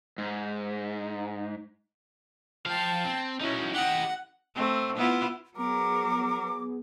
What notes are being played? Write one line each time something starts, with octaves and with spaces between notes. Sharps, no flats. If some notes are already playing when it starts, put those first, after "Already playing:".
G#2
F3 F5 G5 A5
C4
C#4 D#4 E4 F#4
G4 D#5 F#5
A3 C4
B3 E4 F4
F#3 B3 G#4 A#4 D6